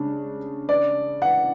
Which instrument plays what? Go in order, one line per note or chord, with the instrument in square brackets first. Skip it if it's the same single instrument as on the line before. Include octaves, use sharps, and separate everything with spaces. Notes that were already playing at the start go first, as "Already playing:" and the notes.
Already playing: [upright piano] C#3 D4
[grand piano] D5
F#5